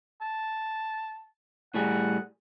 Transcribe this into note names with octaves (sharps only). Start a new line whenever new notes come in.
A5
A2 G3 G#4 F#5